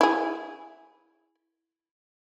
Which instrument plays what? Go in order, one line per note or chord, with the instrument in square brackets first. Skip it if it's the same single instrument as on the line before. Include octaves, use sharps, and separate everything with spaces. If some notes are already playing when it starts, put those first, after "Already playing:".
[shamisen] E4 G#4